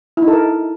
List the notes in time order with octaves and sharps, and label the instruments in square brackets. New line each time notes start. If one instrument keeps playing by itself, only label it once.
[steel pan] E4
D#4
A4
A#4